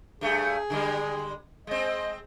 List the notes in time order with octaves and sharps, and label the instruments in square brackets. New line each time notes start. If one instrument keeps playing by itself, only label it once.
[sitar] G2 A3 [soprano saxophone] G#4
[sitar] D3 G3 G#3
[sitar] G#3 C4 [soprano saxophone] D#5